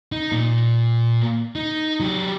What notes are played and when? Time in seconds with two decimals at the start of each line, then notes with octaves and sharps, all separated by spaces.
0.12 D#4
0.32 A#2
1.56 D#4
2.00 F#3 G4